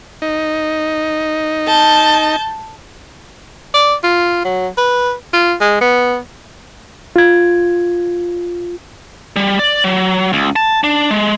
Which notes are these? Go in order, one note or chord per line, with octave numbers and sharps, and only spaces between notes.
D#4
A5 G6
D5
F4
F#3
B4
F4
G#3
B3
F4 G#6
G3
D5
F#3
C#2
A5
D4
G#3